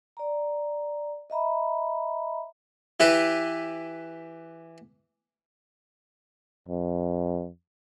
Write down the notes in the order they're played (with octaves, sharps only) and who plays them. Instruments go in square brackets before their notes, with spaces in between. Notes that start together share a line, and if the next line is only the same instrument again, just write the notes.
[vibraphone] D5 A#5
D#5 E5 A#5 B5
[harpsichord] E3 E4 G4 B4
[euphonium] F2